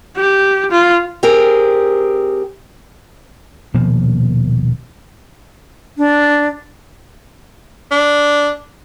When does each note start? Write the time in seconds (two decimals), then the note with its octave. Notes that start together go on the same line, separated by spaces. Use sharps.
0.17 G4
0.71 F4
1.23 C4 G4 G#4 A#4
3.74 D#1 B2 F3 A#3
5.98 D4
7.91 D4